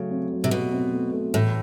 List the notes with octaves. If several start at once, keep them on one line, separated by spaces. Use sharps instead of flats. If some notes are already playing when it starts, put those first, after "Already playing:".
Already playing: C#3 F#3 A3
C4
F#3
C3
B2 F#3
C4
A3
A3
A2 E3